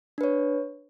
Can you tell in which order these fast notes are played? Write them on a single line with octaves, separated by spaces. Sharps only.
D4 B4 C#5